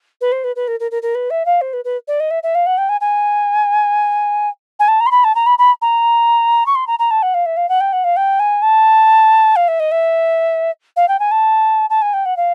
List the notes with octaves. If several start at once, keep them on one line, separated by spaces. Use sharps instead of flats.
B4
C5
B4
B4
A#4
A#4
A#4
A#4
B4
E5
F5
C5
B4
B4
D5
D#5
E5
E5
F5
F#5
G5
G#5
G#5
G#5
A5
A#5
C6
B5
A5
A#5
B5
B5
A#5
C#6
C6
A#5
A#5
A5
F#5
F5
E5
F5
F#5
G5
F#5
F5
G5
G#5
A5
F5
E5
D#5
E5
F5
G5
G#5
A5
A5
G#5
G5
F#5
F5